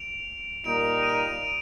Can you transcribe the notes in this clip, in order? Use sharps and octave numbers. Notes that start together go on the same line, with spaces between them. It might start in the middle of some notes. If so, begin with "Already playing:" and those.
Already playing: D7 F7
A#2 G3 A#3 D#4 A#4 D7 F7
D#7
D7 F7